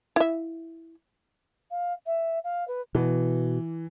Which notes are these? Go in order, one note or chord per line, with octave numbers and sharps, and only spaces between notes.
E4 E5
F5
E5
F5
B4
B2 E3